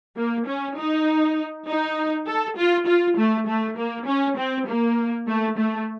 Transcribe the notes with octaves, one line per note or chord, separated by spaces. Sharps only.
A#3
C#4
D#4
D#4
A4
F4
F4
A3
A3
A#3
C#4
C4
A#3
A3
A3